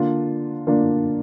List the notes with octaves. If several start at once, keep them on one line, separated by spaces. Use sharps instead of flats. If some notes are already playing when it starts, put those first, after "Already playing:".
Already playing: D3 A#3 D4 F4
D3 A#3 D4 F4